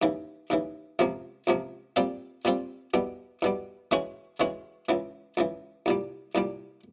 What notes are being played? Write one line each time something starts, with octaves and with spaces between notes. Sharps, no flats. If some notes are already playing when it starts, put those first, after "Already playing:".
D#2 C#3 E3
D#2 C#3 E3
C#2 C3 F3 A#3
C#2 C3 F3 A#3
A#2 G3 C4 F4
A#2 G3 C4 F4
E2 B2 G3
E2 B2 G3
C#3 E3 G#3 C#4 F#4
C#3 E3 G#3 C#4 F#4
C#2 C#3 E3
C#2 C#3 E3
C2 A#2 G3
C2 A#2 G3